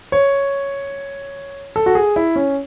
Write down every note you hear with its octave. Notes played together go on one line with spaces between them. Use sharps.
C#5
A4
F#4
G#4
E4
C#4